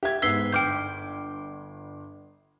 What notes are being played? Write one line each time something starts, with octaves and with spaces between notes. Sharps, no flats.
G4 E5 G#6
G#2 B3 E6 B6 C7 G7
G1 G5 D6 F6 G6